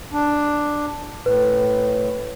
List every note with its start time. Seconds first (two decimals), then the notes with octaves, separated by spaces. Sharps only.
0.13 D4
1.26 A2 B4